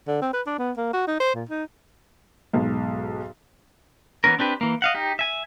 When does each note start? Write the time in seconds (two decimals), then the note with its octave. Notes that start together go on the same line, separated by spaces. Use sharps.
0.07 D3
0.21 C4
0.33 B4
0.47 D4
0.59 B3
0.77 A#3
0.93 F#4
1.08 D#4
1.20 C5
1.35 A#2
1.49 D#4
2.53 B1 G#2
4.24 E3 B3 C#4 A#4
4.39 C4 D4 G4 B4
4.61 E3 A#3
4.82 D#5 F5 F#5
4.94 D#4 G4
5.19 E5 G#5